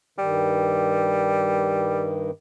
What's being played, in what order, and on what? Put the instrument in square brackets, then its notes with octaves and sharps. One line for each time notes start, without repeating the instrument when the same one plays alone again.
[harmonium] G2 D#3 [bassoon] G3